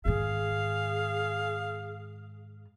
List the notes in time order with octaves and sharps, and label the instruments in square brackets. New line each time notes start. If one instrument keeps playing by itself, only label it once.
[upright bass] G#2 D#3 [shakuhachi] G#4 [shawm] F5